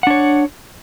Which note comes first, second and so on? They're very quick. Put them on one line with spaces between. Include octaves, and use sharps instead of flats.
F#5 D4 C#5